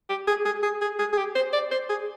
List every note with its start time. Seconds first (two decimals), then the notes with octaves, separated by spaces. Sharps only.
0.09 G4
0.27 G#4
0.45 G#4
0.63 G#4
0.82 G#4
0.99 G#4
1.13 G#4
1.17 G4
1.35 C5
1.53 D5
1.71 C5
1.89 G#4